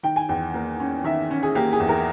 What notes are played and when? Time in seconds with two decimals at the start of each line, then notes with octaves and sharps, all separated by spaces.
0.03 D#3 G5
0.16 G#5
0.29 E2 G5
0.54 A#3
0.80 C#4
1.04 D#3 E5
1.31 C#4
1.43 G#4
1.55 A#3 G4
1.73 G#4
1.80 E2
1.89 A#4